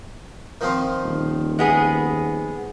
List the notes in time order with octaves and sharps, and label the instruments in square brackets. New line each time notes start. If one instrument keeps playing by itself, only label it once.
[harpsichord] D#3 F3 C4
[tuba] D#1
[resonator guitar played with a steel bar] G#3 B3 G#4